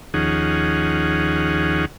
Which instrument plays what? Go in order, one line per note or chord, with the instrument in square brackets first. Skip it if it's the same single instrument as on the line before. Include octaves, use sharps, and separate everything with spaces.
[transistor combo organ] D#2 F3 C#4 D#4 G#4 F#5